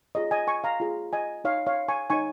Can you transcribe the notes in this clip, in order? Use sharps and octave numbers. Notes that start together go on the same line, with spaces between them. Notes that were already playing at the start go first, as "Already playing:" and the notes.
F4 G#4 C#5 D#5
D#5 G#5
G#5 C#6
F5 A#5
F4 G#4 C#5
D#5 G#5
D#4 C#5 F5
C#5 F5
G#5 C#6
D#4 C#5 G#5 C#6